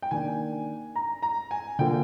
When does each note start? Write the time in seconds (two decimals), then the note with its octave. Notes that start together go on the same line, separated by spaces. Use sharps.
0.02 G5
0.11 D#3 A#3 D4 G#5
0.96 A#5
1.22 A#5
1.51 G#5
1.79 D3 F3 A#3 G5